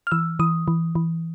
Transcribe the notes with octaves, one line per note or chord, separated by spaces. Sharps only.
F6
E3 E6
E3 D#6
E3
E3